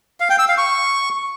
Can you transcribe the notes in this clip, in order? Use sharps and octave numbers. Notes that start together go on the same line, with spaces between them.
F5
G5
E6
F5
C#6